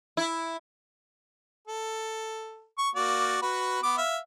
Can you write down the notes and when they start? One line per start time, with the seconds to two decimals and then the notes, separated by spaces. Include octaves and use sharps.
0.17 E4
1.67 A4
2.78 C#6
2.96 A#3 F#4 D5
3.42 F#4 B4
3.83 B3 D6
3.98 E5 F5